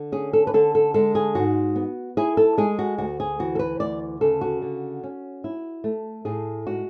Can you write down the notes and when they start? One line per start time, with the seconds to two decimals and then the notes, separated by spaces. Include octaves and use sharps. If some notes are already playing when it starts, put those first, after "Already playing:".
Already playing: D3
0.12 C#4 G#4
0.33 A4
0.47 B4
0.54 D3 A4
0.75 A4
0.94 G#3 A4
1.15 G#4
1.35 G#2 F#4
1.76 B3
2.17 E4 G#4
2.37 A4
2.57 G#3 G#4
2.79 F#4
2.98 D2 F#4
3.20 G#4
3.39 E3 F#4
3.55 A4
3.59 B4
3.80 D2 D5
4.21 C#3 A4
4.41 F#4
4.62 D3
5.03 C#4
5.44 E4
5.84 A3
6.25 A2 G#4
6.66 G#3 F#4